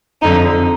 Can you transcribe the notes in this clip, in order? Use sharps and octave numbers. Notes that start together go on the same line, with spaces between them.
F2 D3 D#4